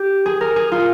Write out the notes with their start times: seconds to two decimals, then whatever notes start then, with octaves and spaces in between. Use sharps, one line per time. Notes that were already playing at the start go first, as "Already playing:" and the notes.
Already playing: G4
0.26 G#4
0.41 A#4
0.56 G#4
0.72 F4